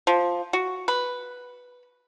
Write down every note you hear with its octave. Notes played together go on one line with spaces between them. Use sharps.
F3
F#4
B4